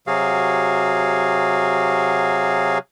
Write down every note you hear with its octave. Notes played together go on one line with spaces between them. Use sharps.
C3 F#3 F#4 G#4 F5